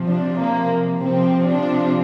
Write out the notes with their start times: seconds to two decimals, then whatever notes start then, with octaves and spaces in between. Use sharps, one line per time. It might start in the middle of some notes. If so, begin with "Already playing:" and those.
Already playing: C3 F3
0.09 D4
0.40 A#3
1.01 C3 F3 C4
1.48 D4